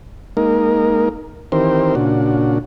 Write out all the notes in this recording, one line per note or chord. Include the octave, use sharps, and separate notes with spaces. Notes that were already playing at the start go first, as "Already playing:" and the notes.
G#3 A#3 D#4 A#4
D#3 E3 C4 G4 A#4 C5
A#2 C#3 D4 F#4